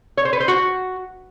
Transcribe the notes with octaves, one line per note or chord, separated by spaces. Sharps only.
C#5
C5
B4
C5
F#4